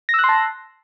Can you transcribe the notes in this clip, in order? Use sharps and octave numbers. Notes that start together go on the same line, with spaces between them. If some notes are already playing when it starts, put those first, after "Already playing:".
A5 C6 E6 F#6 A#6